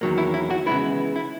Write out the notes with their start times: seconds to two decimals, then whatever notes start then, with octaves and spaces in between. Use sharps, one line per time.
0.01 E2 D#3 F#3 A#3
0.18 E4
0.34 E4
0.50 F#4
0.66 C#3 E3 G#3 B3 E4
1.16 E4